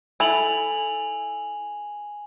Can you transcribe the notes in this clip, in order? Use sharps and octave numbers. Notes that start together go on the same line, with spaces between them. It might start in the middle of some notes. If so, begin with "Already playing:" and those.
E4 A4 G#5 F7 F#7